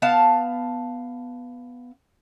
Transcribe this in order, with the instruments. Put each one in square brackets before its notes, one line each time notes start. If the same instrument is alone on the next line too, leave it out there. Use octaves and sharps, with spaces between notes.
[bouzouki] B3 F5 A5